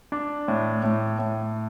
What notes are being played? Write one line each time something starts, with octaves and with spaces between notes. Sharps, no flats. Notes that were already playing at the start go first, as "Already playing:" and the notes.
D4
A2
A2
A2